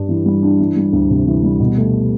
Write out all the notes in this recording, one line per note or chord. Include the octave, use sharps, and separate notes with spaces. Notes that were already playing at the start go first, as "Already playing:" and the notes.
Already playing: G2 G3 D4
E3
G3
D4
E3
G3
D2
C3
E3
G3
B2
A3